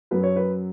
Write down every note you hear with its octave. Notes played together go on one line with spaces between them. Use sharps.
F#2 F#3 B4
C#5
B4